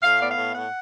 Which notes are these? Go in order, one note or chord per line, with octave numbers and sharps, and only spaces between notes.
A2 F5
B3 D5
F5
A2
A2 F#5